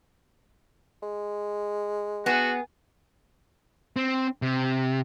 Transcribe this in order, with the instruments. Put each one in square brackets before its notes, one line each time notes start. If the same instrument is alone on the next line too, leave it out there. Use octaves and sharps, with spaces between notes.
[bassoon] G#3
[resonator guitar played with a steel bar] B3 G#4 [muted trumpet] F#4
[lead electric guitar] C4
C3